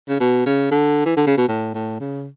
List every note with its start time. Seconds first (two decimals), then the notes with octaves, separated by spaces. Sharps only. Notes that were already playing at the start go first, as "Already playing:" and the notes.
0.09 C#3
0.20 B2
0.46 C#3
0.71 D3
1.06 E3
1.17 D3
1.27 C#3
1.37 B2
1.48 A2
1.74 A2
2.00 C#3